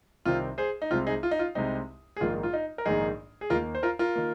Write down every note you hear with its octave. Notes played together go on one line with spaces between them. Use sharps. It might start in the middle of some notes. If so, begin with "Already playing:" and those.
C2 C3 D#3 C4 F4
G#4 C5
D#4
C2 C3 G#3 C4 F4
D#4 G#4
F4
D#4
F4
C2 C3 G#3 C4 D#4
G#4
A#1 G#2 D#3 A#3 F4
F4
D#4
A#4
A#1 G#2 D#3 A#3 D#4 G#4
G#4
D#2 D#3 A#3 F4 A#4
C5
F4 A#4
F4 A#4
D#3 A#3